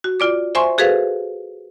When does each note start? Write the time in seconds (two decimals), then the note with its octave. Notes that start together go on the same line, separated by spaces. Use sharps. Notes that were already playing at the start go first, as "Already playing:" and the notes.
0.04 F#4
0.20 F4 D5 D6
0.55 C5 E5 G#5 C6 C#6
0.78 F#4 G#4 A4 B4 C5 F5